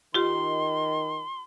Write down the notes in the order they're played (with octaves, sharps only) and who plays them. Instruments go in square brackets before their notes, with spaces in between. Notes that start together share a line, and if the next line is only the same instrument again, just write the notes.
[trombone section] D#3 [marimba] F4 G4 [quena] C6